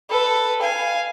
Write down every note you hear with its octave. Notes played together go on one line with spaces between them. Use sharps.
A4 B4
F5 G#5